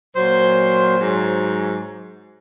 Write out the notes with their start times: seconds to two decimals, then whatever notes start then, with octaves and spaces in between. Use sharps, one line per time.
0.17 A#2 F#3 C5
0.98 G#2 F#3